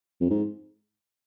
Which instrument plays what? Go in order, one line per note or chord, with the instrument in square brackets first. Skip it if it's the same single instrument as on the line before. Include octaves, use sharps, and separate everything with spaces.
[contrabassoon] F2
G#2